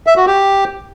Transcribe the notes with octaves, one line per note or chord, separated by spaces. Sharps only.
E5
F#4
G4